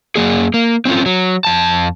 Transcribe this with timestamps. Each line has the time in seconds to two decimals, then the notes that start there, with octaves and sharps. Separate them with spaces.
0.16 F#2 A#3 G#4
0.54 A#3
0.85 C4 C#4 F4
1.06 F#3
1.45 F2 A5